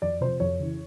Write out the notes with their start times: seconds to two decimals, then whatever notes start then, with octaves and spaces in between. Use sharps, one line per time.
0.02 F2 D5
0.21 C3 F3 C5
0.40 F2 C#5
0.60 C#3 E3